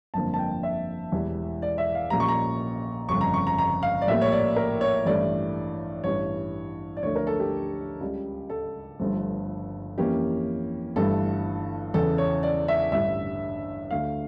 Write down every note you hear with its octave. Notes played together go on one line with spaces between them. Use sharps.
G1 F2 D3 F3 A#3 A5
A5
G5
E5
E1 E2 E3 G3
D5
E5
F5
A#1 A#2 G3 C#4 A#5
C#6
A#5
G1 F2 C#3 C#6
A#5
C#6
A#5
A#5
F5
D5
A#1 A2 G3 A#3 E5
C#5
D5
A#4
C#5
A1 G2 E3 A3 D5
A1 G2 E3 C#5
D5
D2 D3 F3 A3 C#5
A#4
A4
G4
C#2 C#3 G3
A4
G1 G2 F3 A3
F2 E3 A#3 C#4 G4
G1 G2 E3 A3 A4
E2 C#3 E3 A4
C#5
D5
E5
A1 G2 D3 E5
D2 D3 A3 F5